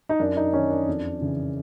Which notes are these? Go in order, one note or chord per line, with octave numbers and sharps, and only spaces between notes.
D#4
F#2 D4
D#4
D#3 C#4
D4
F2
C#3 E3